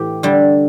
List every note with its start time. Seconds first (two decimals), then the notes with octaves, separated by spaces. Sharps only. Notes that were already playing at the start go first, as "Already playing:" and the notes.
Already playing: A2 E3 G4
0.23 D3 G3